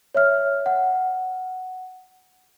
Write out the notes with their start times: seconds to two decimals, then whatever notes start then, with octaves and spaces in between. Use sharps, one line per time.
0.15 C#5 E5 F6
0.66 F#5